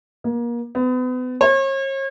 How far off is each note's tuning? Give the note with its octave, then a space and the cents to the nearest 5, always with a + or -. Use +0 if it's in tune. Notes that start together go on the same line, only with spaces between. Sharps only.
A#3 +30
B3 +35
C#5 -40